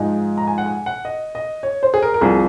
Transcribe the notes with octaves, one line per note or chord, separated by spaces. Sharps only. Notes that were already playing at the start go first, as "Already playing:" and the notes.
Already playing: G#2 F3 G#3 D#4 G#5
A#5
G#5
F#5
G#5
F#5
D#5
D#5
C#5
C5
G#4
A#4
A#4
C2 C3 F3 G#4